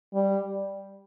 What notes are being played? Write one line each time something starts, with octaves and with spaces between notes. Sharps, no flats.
G3